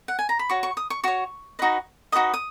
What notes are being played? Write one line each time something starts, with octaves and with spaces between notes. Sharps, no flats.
F#5
G#5
A#5
B5
F#4 C#5 C#6
C#6
D#6
C#6
F#4 C#5 C#6
D#4 F#4 B4 D#5
D#4 F#4 B4 D#5 D#6
D#6